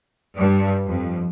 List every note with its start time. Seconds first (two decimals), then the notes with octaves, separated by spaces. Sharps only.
0.36 G2
0.86 F2